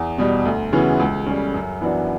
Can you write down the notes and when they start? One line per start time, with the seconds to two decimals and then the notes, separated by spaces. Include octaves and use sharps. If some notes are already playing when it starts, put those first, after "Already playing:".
Already playing: E2
0.18 B2 G3
0.45 D2
0.73 C#3 E3 B3 F#4
1.00 C#2
1.26 C#3 G3
1.54 F#2
1.81 E3 B3 D4 F#4